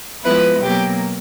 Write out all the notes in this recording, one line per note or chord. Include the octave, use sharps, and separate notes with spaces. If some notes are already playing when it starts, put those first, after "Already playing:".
F3 G#3 B3 E4 B4
B2 F#3 A#3 G4